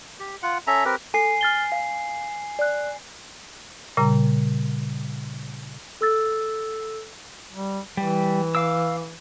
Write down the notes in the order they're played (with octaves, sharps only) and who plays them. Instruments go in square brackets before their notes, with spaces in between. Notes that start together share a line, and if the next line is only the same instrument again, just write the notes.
[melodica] G4
F4 F#5
C#4 A4 E5 A#5
C4 G4 A#4 B4
[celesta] A4 [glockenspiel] G#5 C7
[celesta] F6 A6 G7
F5
D5 F#6
[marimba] A#2 C#3 G3 A#5
[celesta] A4 E6 A6
[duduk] G3
[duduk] E3 [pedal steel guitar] G3
[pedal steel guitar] F5 D6 E6